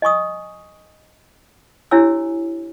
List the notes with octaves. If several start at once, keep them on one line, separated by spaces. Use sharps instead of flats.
D#5 G#5 C#6 D#6
D4 E4 G4 C#5 G#5 E6